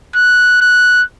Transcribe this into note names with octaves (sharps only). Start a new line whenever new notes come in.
F#6
F#6